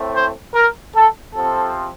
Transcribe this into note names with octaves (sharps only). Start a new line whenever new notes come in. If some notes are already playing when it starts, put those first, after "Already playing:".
Already playing: A2 A3 C4
C5
A#4
A4
C3 F3 C4 A4